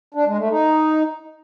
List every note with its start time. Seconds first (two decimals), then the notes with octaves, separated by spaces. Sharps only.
0.14 D4
0.26 G#3
0.38 A3
0.50 D#4